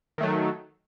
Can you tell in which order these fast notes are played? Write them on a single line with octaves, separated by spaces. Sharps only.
D#3 A3 F#3